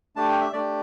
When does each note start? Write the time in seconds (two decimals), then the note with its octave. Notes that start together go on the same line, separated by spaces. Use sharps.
0.16 A3 D4 G4 A5
0.29 G5
0.41 E5
0.53 A3 D4 G4 D5